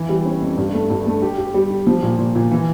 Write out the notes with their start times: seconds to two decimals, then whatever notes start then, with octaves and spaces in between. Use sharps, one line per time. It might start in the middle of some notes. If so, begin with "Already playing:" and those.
Already playing: E3 E4
0.09 G3
0.25 C#4
0.41 F2
0.57 G2
0.73 A3
0.90 G2
1.07 A3
1.22 G4
1.38 G4
1.54 G3
1.70 G4
1.87 F3
2.03 A#2
2.19 A#2
2.35 A#2
2.51 E3